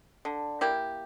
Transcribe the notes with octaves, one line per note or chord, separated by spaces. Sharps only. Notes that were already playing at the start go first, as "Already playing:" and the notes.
D3
A#3 E4 G4